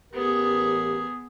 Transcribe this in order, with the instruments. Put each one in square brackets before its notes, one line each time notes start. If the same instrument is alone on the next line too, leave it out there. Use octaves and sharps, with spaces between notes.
[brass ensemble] A1 A#4 [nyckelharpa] B3 G#4 [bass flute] G4